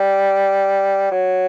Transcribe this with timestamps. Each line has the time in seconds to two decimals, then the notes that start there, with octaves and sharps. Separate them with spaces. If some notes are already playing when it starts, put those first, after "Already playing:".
Already playing: G3
1.11 F#3